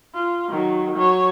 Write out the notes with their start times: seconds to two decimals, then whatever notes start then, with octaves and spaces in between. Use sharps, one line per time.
0.14 F4
0.50 D#3 F#3
0.95 F#3 C#5